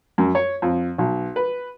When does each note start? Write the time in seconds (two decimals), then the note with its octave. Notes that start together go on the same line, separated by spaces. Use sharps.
0.18 F#2
0.35 C#5
0.62 F2
0.98 B1
1.36 B4